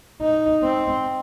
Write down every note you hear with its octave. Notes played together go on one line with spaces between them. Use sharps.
D#4
C4